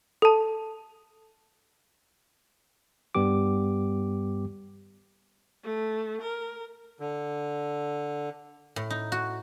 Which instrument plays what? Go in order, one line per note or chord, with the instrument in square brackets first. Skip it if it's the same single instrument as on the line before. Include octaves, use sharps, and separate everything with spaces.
[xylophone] A4 A5
[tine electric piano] G2 G3 B3 G4 D6
[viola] A3
A#4
[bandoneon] D3
[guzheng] A2
D#4
F#4